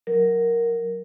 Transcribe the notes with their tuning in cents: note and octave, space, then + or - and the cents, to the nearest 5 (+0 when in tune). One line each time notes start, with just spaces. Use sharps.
F#3 +0 A#4 +0